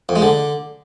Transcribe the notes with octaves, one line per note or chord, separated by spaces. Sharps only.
F2
G#3
D3